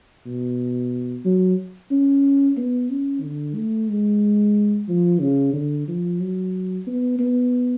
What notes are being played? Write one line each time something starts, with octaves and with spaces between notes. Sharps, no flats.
B2
F#3
C#4
B3
C#4
D3
A3
G#3
F3
C#3
D3
F3
F#3
B3
B3